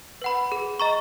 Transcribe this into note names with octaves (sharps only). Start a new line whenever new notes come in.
B4 F#5 B5
G#4
D#5 A#5 C#6